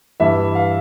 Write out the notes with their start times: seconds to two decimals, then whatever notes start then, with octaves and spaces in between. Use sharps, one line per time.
0.20 G2 E3 E5
0.55 F5